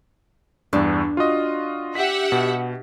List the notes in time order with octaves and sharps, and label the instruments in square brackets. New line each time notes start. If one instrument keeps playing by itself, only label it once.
[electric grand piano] E2 G2 [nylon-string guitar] D4
[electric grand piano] F4 F#4 D#5
[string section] G4 E5 F#5 [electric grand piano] B6
[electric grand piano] B2